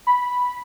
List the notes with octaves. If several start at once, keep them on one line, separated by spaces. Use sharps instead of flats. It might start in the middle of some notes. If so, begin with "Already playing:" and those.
B5